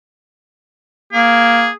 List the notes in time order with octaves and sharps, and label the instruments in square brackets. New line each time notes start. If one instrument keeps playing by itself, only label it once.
[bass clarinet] A#3 [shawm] G#4